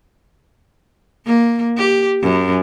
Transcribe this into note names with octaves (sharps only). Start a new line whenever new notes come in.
A#3
G4
F#2